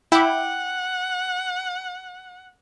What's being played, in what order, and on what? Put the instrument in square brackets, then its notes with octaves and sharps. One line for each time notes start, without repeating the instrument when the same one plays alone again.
[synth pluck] E4 [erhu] F#5 [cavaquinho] G5 D6